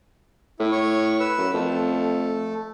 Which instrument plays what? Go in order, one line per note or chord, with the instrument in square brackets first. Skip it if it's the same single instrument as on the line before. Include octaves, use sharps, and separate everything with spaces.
[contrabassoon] A2 [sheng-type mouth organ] E4
[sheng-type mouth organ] C#5 C#6
B4 E6
[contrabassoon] F#2
[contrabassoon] F2 [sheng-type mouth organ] A3